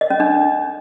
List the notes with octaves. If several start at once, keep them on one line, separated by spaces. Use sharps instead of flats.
D#5
C#4
D4